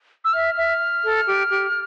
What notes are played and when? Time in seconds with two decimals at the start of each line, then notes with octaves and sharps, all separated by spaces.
0.25 E6
0.33 E5 F6
0.57 E5
1.04 A4
1.27 G4
1.50 G4